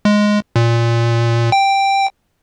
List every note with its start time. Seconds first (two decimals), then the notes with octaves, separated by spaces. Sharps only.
0.05 G#3
0.56 A#2
1.52 G5